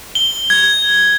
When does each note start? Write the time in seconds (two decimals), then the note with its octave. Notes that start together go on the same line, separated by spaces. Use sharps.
0.15 G7
0.50 G#6